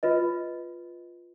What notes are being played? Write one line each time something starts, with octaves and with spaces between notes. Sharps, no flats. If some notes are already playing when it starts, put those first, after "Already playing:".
F4 B4 D#5